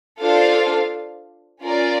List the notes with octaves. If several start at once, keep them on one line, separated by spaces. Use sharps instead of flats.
D4 F4 A4 C5 F5
C#4 F4 A#4 D5